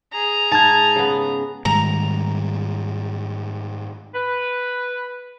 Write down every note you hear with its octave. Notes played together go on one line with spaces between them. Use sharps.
G#4 A#5
G#2 A5 G#6
C#3 B3
G#2 D#3 G3 A#5
B4